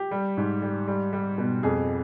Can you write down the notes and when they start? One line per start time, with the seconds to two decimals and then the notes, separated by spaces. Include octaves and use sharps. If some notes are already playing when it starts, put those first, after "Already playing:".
Already playing: G4
0.11 G3
0.37 G#2
0.62 G3
0.88 G3
1.13 G3
1.38 B2
1.63 F2 G#4